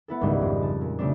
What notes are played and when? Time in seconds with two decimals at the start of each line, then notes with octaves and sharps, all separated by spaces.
0.08 B3 E4 A4
0.21 G#1 C#2 G#2 G3
0.41 F2 C4
0.62 A5
0.81 A#2
0.99 C#3 G3 A3 C4 D4